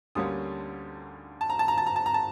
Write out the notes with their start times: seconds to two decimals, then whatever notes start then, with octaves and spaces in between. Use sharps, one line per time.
0.15 D2 D3 G3 A#3 C#4 D#6
1.41 A5
1.50 A#5
1.59 A5
1.68 A#5
1.78 A5
1.87 A#5
1.96 A5
2.06 A#5
2.14 A5